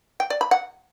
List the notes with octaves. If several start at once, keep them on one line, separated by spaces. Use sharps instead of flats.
G5
D5
B5
F#5